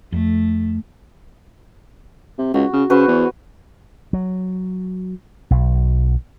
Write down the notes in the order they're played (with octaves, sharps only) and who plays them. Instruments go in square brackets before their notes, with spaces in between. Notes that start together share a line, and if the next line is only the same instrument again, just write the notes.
[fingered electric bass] F2 [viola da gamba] A3
[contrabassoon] C3
[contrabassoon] C#2 [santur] F#4
[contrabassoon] C#3
[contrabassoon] C#3 [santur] F#4 B4 C5
[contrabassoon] E2
[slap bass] F#3
B1